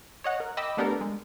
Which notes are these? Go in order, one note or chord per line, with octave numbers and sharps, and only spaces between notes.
C#5 D#5 F#5
A#4
D#5 G5 B5 D6 E6
A3 B3 D4 G4 A4 A#4
G#3